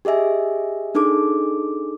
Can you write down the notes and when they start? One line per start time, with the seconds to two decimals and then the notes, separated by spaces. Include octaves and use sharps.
0.05 G4 G#4 D#5 E5 G#5
0.95 D4 D#4 G#4 A4 D6